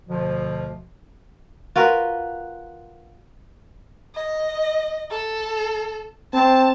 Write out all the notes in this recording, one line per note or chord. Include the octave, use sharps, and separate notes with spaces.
D2 B2 D3 F3
F4 F#4 A#4 B4
D#5
A4
C4 A5